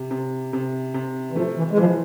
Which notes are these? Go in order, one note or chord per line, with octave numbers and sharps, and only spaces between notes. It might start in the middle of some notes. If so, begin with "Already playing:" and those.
Already playing: C3
C3
C3
C3
E3
F3 A3
E3
G#3
E3 F3